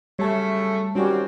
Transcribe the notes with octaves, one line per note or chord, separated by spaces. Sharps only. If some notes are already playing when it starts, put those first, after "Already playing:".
C#3 F#3 G3 A3 C#5 E5 A5
D#3 G3 C4 C#4 F#4